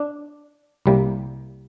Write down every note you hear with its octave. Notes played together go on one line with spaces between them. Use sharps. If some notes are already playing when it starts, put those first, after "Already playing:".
Already playing: D4
C2 C3 G3 A#3